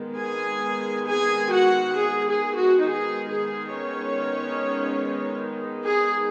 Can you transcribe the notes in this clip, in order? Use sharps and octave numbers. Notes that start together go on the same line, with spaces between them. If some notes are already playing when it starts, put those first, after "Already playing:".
Already playing: D#3 G#3 B3
G#4 G#5
G#4 G#5
F#4 F#5
G#4
G#4
F#4
D#3 G#3 B3 D#4 G#4
G#4
C#4 C#5
G#4